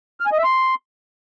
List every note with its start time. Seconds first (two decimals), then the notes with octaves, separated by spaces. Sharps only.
0.20 F6
0.26 G#5
0.32 D#5
0.38 E5
0.44 C6